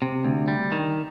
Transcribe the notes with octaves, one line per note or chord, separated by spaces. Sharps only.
C3
D2
G3
D#3